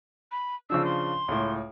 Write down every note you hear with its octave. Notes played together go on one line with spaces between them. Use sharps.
B5
C#3 F3 D4 E6
C6
C#2 A2